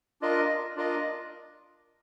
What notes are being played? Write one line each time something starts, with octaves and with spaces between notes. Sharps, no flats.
D4 F4 A#4 D#5
D4 F4 A#4 D#5